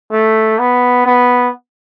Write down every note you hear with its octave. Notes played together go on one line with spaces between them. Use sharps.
A3
B3
B3